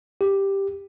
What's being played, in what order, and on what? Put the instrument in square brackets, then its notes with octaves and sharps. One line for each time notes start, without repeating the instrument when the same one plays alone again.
[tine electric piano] G4